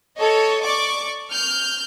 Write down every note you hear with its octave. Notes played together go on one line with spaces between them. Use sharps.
A4 C#5 D#5
D5 C#6 D6
F6 G6